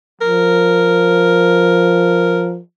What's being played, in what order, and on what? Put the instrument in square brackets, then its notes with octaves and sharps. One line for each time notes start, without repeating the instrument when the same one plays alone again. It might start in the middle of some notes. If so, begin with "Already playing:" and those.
[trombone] F3 [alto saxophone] A#4